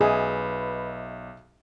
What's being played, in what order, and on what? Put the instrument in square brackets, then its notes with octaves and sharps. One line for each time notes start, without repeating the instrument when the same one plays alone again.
[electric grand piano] B1 [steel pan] G#4 [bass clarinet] B4 [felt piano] D#5 E5